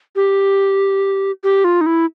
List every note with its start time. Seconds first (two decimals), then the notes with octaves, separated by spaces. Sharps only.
0.16 G4
1.44 G4
1.64 F4
1.81 D#4
1.86 E4